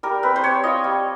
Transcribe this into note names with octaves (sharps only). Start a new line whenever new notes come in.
G3 A#4
C4 B4
C5
G3 C#5
F4 D#5
G3